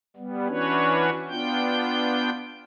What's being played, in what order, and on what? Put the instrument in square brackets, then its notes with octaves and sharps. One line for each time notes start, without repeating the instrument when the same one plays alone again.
[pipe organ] G3 B3
E3 C#4 D4 F#4 B4 C#5
B3 D4 F4 G5 G6